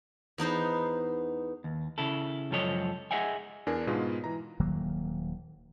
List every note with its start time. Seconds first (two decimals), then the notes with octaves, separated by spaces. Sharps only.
0.38 E2 B3 D#4 C5
1.64 D#2
1.98 C#3 E4 A4
2.51 C#2 F#2 F3 A4 C#5 D#5
3.11 G#4 C5 D#5 E5 F#5 G#5
3.67 E2 D4 A#4 G#5
3.87 G#2 B2 G#3 F4
4.24 E3 A#5
4.59 D#1 D#3 F#3 A#3